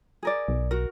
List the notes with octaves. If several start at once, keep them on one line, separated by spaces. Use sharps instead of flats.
G#4 A#4 D5
B1
F#4 A#4